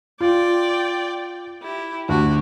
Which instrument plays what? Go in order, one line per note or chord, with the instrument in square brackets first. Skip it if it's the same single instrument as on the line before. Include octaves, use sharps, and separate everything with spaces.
[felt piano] F4 [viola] D5 G5
[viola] E4 G4
[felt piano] D2 [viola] F#4 G4